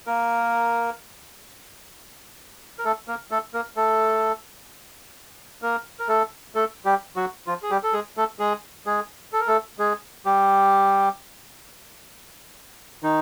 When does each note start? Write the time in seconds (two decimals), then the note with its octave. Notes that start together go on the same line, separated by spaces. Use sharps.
0.07 A#3 A#4
2.79 A#4
2.85 A3 A4
3.08 A#3 A#4
3.31 A3 A4
3.54 A#3 A#4
3.76 A3 A4
5.62 A#3 A#4
6.00 A#4
6.08 A3 A4
6.55 A3 A4
6.85 G3 G4
7.16 F#3 F#4
7.47 F3 F4
7.63 G#4
7.70 G3 G4
7.83 A4
7.93 G#3 G#4
8.17 A3 A4
8.39 G#3 G#4
8.86 G#3 G#4
9.33 A4
9.40 A#4
9.48 A3 A4
9.79 G#3 G#4
10.25 G3 G4
13.02 D#3 D#4